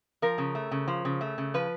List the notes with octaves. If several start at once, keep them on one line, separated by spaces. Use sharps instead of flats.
F3 A#4
C#3
A3
C#3
F3
C#3
A3
C#3
F3 B4